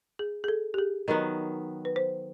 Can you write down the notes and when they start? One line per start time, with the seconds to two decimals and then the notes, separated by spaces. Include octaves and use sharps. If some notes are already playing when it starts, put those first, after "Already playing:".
0.19 G#4
0.44 G#4
0.48 A4
0.74 G4
0.78 G#4
1.08 D#3 F#3 B3 A#4
1.85 B4
1.96 C5